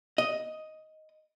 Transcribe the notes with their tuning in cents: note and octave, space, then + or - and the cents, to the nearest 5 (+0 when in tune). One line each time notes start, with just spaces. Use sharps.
D#5 +5